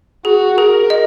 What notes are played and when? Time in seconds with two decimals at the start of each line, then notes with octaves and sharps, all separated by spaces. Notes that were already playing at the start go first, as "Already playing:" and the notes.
0.25 F#4 G#4
0.58 G#4 A#4
0.90 D#5